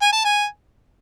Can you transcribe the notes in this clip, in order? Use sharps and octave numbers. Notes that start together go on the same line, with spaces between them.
G#5
A5
G#5